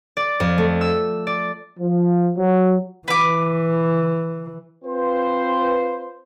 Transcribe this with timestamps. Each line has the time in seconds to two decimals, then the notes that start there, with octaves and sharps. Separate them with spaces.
0.17 D5
0.40 F2
0.58 A3
0.81 E6
1.27 D5
1.79 F3
2.37 F#3
3.08 E3 B4 D6
4.85 C4 F4 B4 C5